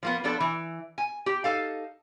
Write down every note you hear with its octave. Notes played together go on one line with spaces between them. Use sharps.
F3 A#3 B3
F3 B3 D4 A4
E3
G#5
G4
D#4 A4 F5